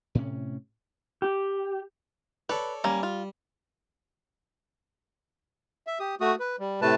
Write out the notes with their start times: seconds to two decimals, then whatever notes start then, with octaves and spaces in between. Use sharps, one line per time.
0.15 A2 C3 C#4
1.22 G4
2.49 A4 B4 C#5 D5
2.84 G3 A#3 C#4
3.03 F4
5.87 E5
6.00 G4 D#6
6.21 A3 F#4 D#6
6.40 B4
6.59 G3
6.82 A2 C3 A3 B4 A5